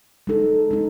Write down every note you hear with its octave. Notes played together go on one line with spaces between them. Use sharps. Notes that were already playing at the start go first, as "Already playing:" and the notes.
G#3 D#4 A4
G#3 D#4